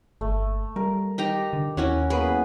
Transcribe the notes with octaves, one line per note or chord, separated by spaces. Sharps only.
G1 A3
G3 A#4
D#4 G4 A#5
D3
D#2 C#4 E4 F#4 C#5
F#2 A#3 B3 G#4 B4